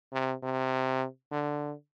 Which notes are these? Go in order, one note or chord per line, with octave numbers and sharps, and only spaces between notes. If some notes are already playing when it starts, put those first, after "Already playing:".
C3
C3
D3